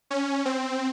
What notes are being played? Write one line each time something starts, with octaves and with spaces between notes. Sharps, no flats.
C#4
C4